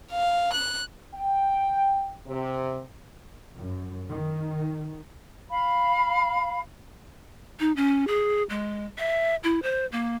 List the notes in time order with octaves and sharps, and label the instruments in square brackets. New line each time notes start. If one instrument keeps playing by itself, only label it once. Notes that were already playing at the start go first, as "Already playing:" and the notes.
[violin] F5
F#6
[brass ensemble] G5
C3
[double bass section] F#2
D#3
[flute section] F5 B5
[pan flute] D#4
C#4
G#4
G#3
E5
E4
C5
A#3